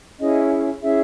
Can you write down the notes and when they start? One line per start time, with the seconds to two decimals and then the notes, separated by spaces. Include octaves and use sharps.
0.20 C#4 E4 G#4 D#5
0.82 C#4 E4 G#4 E5